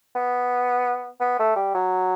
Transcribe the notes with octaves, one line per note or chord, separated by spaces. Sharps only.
B3
B3
A3
G3
F#3